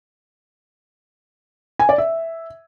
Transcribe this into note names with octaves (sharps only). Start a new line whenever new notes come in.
G#5
D5
E5